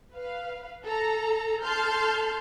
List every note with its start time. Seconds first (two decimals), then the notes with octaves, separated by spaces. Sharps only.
0.14 B4 F5
0.84 A4 A#5
1.63 A4 A5 C6 F6 G6